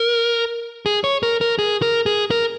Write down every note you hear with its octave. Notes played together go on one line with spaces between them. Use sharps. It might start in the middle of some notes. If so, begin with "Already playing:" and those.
Already playing: A#4
G#4
C#5
A#4
A#4
G#4
A#4
G#4
A#4